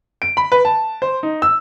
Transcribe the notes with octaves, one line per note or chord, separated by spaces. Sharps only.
D7
B5
B4
A5
C5
D#4
E6